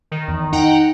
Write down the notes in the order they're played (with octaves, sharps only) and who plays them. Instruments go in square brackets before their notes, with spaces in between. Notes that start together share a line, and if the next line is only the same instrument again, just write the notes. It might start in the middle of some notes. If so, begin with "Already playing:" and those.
[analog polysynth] D#3
[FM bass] E2
[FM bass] D#4 [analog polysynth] F#5 G5 A#5